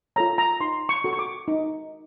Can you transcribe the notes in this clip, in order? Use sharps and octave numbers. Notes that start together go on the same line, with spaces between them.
F4 A4 C#5 A#5
A#5
D#4 C6
C#6
F#4 A4
C#6
D6
D#4